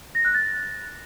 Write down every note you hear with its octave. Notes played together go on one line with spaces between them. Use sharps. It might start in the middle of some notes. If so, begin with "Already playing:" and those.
A#6
F#6
A6